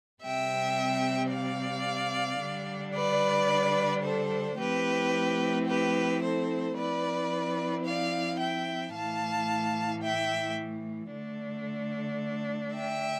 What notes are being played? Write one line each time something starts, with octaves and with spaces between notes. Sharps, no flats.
C3 G3 C4 E5 G5
D5 F5
D3 G3 D4
B4 D5
A4 C5
F3 A3 C4 E4 G4 B4
G4 B4
A4 C5
F3 C4 E4 B4 D5
D5 F5
E5 G5
A2 E3 A3 F5 A5
E5 G5
D3 A3 D4
E5 G5